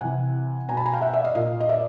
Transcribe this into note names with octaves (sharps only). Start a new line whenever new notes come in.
C3 E3 F#5 G#5
B2 G#5 A#5
A5 B5
G#5 A#5
F5 G5
E5 F#5
D5 E5
D#5 F5
A#2 D#5 F5
D#5
D5 E5